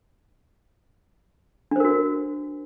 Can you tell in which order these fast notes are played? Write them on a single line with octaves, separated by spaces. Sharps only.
D4 C5 A#4 F#4